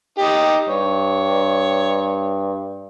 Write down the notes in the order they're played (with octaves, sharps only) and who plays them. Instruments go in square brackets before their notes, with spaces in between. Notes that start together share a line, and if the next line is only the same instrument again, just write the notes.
[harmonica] D#4 G4
[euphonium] G2 [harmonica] C#5